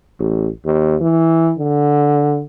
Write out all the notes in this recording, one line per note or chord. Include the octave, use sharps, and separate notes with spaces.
A1
D#2
E3
D3